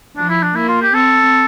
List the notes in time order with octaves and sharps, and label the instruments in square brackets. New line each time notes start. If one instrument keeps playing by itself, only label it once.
[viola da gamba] F3 [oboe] D4
[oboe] E4
D4
[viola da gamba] A#3 [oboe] E4
[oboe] F4
G4
[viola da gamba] C4 [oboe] A4